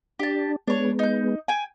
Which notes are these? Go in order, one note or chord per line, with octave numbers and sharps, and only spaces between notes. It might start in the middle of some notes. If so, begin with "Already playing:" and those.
D4 G4 A5
G#3 B3 D4 C#5
D#4 G6
G5 G#5